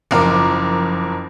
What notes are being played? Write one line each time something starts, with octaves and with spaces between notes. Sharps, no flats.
F#1 F2 A#4 D6